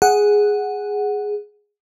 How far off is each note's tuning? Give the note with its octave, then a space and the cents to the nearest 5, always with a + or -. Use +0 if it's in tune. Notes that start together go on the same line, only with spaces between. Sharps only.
G#4 +0 F#5 +0